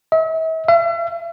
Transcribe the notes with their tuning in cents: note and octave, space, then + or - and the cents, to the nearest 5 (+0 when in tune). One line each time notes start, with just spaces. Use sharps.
E5 -40
E5 +45